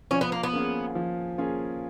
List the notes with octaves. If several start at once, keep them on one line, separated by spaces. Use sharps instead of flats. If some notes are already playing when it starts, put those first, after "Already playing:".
F3 C#4
B3
A#3
B3
A#3 C#4 F4 G#4
F3
A#3 C#4 F4 G#4